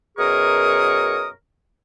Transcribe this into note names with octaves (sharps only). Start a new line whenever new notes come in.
F#2 B2 G#4 A#4 C#6 D#6